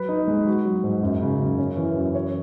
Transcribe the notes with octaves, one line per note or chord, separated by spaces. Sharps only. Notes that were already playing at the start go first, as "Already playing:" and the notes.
Already playing: F#3 B4
D#4
G#3
F#4
F#3
G#2
F#2
C#3
F#2
C#4
E3
F#2
C#5